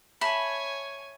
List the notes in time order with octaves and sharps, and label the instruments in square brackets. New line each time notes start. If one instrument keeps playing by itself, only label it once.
[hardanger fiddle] C#5 G#5 [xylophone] E5 A5 E7 [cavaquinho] B5